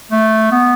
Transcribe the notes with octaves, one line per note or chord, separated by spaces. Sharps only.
A3
B3